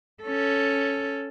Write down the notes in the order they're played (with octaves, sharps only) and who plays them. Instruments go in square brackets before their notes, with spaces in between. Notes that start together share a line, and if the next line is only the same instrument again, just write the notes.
[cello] C#4 A4